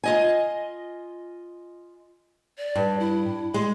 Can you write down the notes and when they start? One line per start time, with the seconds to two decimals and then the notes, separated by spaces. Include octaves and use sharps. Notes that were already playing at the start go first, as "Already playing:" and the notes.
0.04 F4 D#5 G#5
2.58 D5
2.75 G2
3.00 E4
3.54 G#3 C6